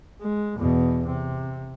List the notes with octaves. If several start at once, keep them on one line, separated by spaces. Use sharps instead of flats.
G#3
E2 B2
C3